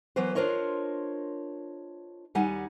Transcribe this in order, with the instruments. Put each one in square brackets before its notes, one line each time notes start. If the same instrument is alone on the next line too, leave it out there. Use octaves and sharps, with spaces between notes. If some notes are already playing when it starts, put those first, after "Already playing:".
[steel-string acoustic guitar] E3 F#3 A#3 B3 B4 C5
D4 F4 A#4 C5 C#5 D#5
D#2 G3 D#4 F#5 G#5